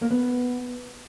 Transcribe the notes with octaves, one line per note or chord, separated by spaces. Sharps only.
A#3
B3